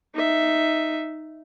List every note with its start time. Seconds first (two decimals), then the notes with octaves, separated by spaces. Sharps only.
0.14 D#4 E5